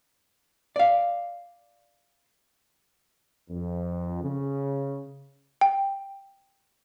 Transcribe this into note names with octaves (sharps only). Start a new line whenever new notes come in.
D5 F5
F2
C#3
G5